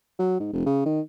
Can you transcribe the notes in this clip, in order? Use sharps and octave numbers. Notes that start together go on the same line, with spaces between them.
F#3
G#2
F1
C#3
D#3